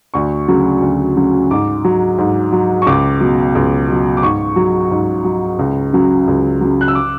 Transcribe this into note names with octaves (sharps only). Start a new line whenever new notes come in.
D2 C#6
C#3 F#3
D2
C#3 F#3
G#2 D6
F#3
G#2
F#3
C#6
C#2 D6
B2 F#3
C#2
B2 F#3
D6
G#2 C#6
F#3
G#2
F#3
C#2
C#3 F#3
C#2
C#3 F#3
F#6
E6
D6